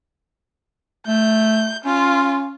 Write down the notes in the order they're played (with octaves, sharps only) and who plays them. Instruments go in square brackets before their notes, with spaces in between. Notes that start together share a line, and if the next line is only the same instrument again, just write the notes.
[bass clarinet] A3 [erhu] G6
[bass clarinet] C#4 [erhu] F4